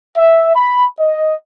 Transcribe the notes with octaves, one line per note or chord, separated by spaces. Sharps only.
E5
B5
D#5